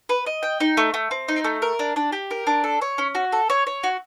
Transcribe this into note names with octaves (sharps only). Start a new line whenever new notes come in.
B4
D#5
G5
D#4
A3
A3
C4
D#4
A3
A#4
D4
D4
G4
A#4
D4
A4
C#5
C#4
F#4
A4
C#5
C#5
F#4